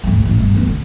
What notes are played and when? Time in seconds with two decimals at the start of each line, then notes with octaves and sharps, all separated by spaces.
0.04 D2 G#2
0.23 A1 A2
0.40 G1
0.54 G2 B3
0.67 D3